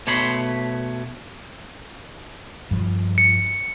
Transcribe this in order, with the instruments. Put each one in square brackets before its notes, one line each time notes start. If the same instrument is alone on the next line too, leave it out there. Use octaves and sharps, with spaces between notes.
[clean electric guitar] B2 A3 C#5 B5 C6
[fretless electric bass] G2 F3
[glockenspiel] C#7